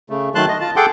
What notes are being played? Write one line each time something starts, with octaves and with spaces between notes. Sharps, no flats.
C#3 A3
D#3 F#3 A3 A5 C6 F#6
D#5
F4 A5
G#4 A4 F#5 G5 C6 D6